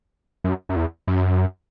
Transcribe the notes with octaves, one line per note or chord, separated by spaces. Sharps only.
F#2
F#2
E2
F#2